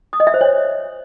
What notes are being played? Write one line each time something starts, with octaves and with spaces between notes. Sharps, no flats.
D#6
D#5
E5
C5
C#5